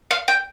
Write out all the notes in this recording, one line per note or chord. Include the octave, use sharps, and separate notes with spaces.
F5
G5